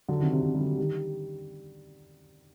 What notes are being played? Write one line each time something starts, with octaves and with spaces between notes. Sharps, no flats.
D3 F#3
C3 D#3
C3
C3 D#3
G3
D3 F#3
D#3 G3